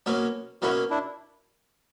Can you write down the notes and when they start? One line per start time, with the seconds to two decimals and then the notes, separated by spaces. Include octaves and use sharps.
0.06 B2 F#3 A#3 C#4
0.62 B2 F#3 A#3 C#4 E4 F#4
0.90 D4 E4